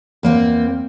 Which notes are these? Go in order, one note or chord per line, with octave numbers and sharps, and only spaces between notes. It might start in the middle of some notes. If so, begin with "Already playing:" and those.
E2 A#3 C4